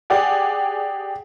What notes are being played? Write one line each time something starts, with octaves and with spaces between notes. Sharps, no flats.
G4 G#4 D5 F#5 G#5